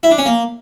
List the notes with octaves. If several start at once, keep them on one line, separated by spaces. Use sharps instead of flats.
E4
D4
C#4
A#3